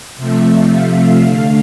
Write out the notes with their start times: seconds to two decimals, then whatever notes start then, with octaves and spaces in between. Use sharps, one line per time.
0.18 C3 F3 A3 E5
0.70 F5
1.23 D3 A3